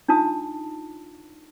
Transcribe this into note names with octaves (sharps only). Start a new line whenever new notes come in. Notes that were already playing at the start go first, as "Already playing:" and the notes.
D4 D#4 F4 A5 D#6